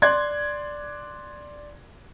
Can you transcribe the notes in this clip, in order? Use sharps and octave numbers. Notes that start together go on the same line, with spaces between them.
D5 C6 F#6 G#6